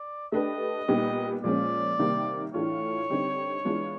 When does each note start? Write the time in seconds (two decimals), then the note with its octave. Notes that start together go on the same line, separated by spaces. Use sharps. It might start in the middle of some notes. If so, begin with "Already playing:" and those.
Already playing: D5
0.32 A3 D4 G4 B4 D#5
0.88 A#2 G3 B3 D#4 G4
1.43 A#2 F3 G#3 C#4 D5
1.99 C3 D#3 G3 A#3
2.54 A2 E3 A3 D4 F4 C#5
3.10 D3 G3 C4 D#4 G4
3.65 E3 G#3 B3 D4 F4